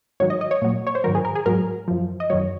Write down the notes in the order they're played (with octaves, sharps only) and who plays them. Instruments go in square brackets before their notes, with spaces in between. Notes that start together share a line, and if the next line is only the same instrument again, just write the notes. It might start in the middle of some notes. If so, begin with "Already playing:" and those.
[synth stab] G#2 D#3 F#3 C#5
D#5
D#5
C#5
A#2 F#3
C#5
C5
G#2 D#3 F#3 A#4
G#4
A#4
G#4
G#2 F#3 A#4
F#2 F3
D#5
F#2 D#3 F#3 C#5